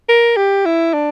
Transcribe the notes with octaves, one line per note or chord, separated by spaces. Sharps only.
A#4
G4
E4
D4